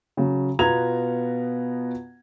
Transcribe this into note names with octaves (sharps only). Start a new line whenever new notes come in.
C#3 F#3
B2 B3 F4 A#5 G#6 F7